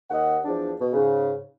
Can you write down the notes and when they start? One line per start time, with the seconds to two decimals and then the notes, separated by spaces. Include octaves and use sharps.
0.10 D#2 D#5 F#5
0.45 E2 F3 D4
0.80 B2
0.93 G#2 C#3